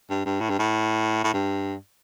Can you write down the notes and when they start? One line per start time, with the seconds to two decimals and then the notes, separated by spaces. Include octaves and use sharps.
0.09 G2
0.25 G2
0.40 A2
0.49 G2
0.59 A2
1.24 A2
1.33 G2